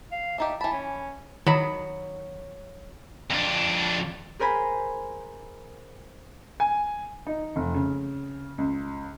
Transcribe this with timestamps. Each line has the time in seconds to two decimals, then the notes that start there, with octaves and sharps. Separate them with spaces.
0.12 F5
0.38 D4 D#4 G4 E5
0.61 E3 A5 B5
0.72 C#4
1.47 D#3 F#3 B5
3.31 F2 D4
4.39 G#4 A#4 C5 G#5 B5
6.60 G#5
7.27 D#4
7.56 F1
7.74 C#3
8.58 C#2